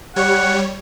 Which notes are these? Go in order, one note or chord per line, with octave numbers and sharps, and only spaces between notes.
G3 C#5 F#5